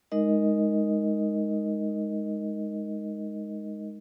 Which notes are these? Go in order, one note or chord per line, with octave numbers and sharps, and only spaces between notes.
G#3 D#4 A#4 D#5